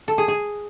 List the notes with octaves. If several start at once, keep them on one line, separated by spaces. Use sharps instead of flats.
A4
G#4
G#4